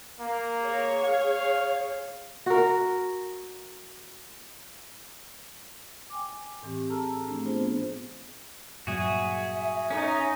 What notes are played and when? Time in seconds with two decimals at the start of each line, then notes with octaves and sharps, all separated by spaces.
0.20 A#3
0.60 G#4 C#5
1.04 F5
2.46 F#4 A#4
6.10 G5 G#5 D6
6.63 A2 E3 C4 G4
6.89 G#4 A4 A5 A#5 E6 F6
7.27 F3 A3 C4 D4
7.45 B3 D4 F4 G#4 C5
8.87 G2 A#2 F#3 F#4 G#4 E5
9.90 C#4 D#4